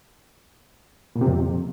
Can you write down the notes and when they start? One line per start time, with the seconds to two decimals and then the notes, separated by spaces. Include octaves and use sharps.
1.16 A#2
1.21 C3
1.27 F2